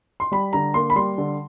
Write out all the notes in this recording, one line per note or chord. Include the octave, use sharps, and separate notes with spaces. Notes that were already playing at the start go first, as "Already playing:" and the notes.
C6
G3 B5
D3 A#5
A#3 C6
B5
G3 C6
D3